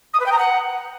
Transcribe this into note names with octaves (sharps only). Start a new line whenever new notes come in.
D#6
B4
G5
A#5
F#5